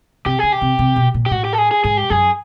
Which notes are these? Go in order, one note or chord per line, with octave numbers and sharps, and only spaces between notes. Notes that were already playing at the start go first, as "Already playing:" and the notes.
C3 G4
C#3 G#4
G4
C3
C3
B2
A#2
G4
A2 F#4
G4
A4
G#4
G#4
G#2 G#4
G4
F#2 G#4